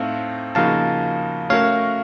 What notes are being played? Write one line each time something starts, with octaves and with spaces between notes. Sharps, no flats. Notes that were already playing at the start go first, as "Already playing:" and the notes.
Already playing: A2 A3 C4 D#4 F5 A5
C#3 F3 A#3 D#4 F#4 F5 A5
A3 C#4 F#4 A#4 C#5 F5